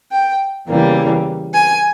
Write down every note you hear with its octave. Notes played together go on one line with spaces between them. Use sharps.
G5
E2 C#3 E3 G3 A#3
G#5